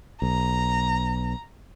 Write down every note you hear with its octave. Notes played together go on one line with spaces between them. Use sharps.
B1 A#5